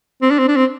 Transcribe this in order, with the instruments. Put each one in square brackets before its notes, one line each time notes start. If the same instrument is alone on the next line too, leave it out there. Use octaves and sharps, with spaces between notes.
[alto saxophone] C4
D4
C4
D4
C4